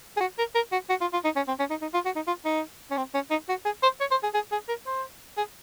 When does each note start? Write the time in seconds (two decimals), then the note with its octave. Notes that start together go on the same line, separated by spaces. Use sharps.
0.17 G#4
0.21 F#4
0.39 A#4
0.55 A#4
0.72 F#4
0.90 F#4
1.01 F4
1.13 F4
1.24 D#4
1.36 C#4
1.48 C4
1.59 C#4
1.70 D#4
1.82 D#4
1.94 F4
2.05 F#4
2.16 D#4
2.27 F4
2.45 D#4
2.91 C#4
2.97 C4
3.14 C#4
3.31 D#4
3.49 F#4
3.65 G#4
3.83 C5
4.00 C#5
4.11 C5
4.23 G#4
4.34 G#4
4.52 G#4
4.69 A#4
4.87 C5
5.37 G#4